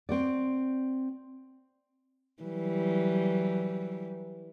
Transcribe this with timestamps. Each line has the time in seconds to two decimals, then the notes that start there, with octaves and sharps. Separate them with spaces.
0.09 C4 F#4 D5
2.43 E3 F#3 G3